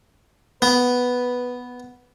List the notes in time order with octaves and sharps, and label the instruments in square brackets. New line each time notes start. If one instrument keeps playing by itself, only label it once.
[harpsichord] B3 [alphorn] B4